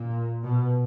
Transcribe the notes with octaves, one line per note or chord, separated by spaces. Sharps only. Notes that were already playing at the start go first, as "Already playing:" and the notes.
Already playing: A#2
B2